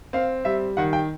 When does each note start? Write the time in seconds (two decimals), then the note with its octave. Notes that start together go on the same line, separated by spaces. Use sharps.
0.13 C4 F5
0.45 G3 E5
0.77 D#3 F#5
0.93 G5